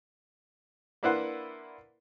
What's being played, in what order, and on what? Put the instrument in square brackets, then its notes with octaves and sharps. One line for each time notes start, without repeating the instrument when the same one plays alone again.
[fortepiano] A#3 D4 E4 B4 C5 F#5